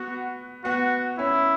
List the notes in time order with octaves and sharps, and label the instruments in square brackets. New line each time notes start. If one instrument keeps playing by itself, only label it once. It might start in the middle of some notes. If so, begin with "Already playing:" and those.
Already playing: [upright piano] B3 [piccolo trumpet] F#4
[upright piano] B3 [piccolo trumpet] F#4
[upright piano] C#4 [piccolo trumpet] E4